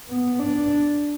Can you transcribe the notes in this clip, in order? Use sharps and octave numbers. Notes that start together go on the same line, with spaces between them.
B3
D4